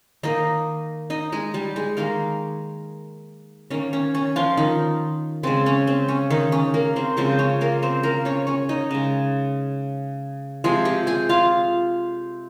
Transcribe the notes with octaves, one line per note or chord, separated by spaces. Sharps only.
D#3 A#3 D#4 D#5
D#4 D#5
G#3 G#4
G3 G4
G#3 G#4
D#3 G#3 A#3 A#4
D#3 A#3 C#4
C#4
C#4
F3 F4
D#3 D#4
C#3 G#3 C4
C#4
C4
C#4
D#3 D#4
C#4
A#3 A#4
C4 C5
C#3 F3 G#3 C4 C5
C#4 C#5
A#3 A#4
C4 C5
A#3 A#4
C#4 C#5
C#4 C#5
D#4 D#5
C#3 G#3
C3 F3 G#3 G#4 G#5
G4 G5
G#4 G#5
F4 F5